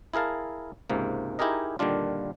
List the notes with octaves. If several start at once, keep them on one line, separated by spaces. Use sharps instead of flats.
E4 G#4 A#4 F5 A5
C#2 G#2 C3 A#3
D#4 E4 G4 G#4 A#4 D#5
A#2 D3 D#3 G3 D4 F4